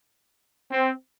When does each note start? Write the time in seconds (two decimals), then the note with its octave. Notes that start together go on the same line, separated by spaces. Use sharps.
0.71 C4